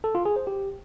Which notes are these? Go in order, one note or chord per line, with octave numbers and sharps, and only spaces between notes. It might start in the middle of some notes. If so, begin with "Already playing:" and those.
A4
F4
G#4
C5
G4